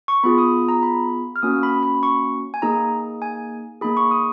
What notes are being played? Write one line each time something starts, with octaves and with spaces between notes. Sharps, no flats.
C#6
B3 F4 G#4 B5
D#6
A#5
B5
F6
A#3 C#4 F#4 D#6
B5
B5
C#6
G#5
A#3 D#4 G#4 A#5
G#5
A#3 D#4 G#4 B5
C#6
D#6